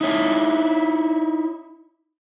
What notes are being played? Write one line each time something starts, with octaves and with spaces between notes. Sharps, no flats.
D#4 E4 C#5